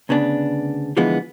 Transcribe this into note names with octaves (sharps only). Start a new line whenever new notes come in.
D2 C#3 B3 D4
D3 E3 F3 G#3 B3